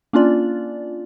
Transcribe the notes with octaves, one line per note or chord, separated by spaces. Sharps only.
A#3 C#4 D4 F4 D5